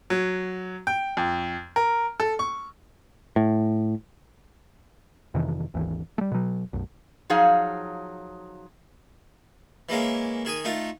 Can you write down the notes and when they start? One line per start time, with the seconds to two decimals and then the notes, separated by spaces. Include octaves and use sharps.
0.10 F#3
0.87 G5
1.17 F2
1.76 A#4
2.20 A4
2.39 C#6
3.36 A2
5.34 F2 C3 D#3 E3
5.74 G#1 D#2 E3
6.18 G3 A3
6.31 B2 F#3
6.73 B1 F#2
7.30 F3 F#3 D#4 G#4 F5
9.89 E3 G#3 A#3 C#4
10.45 D#3 G#4 G#5 D#6
10.65 A3 D#4 F4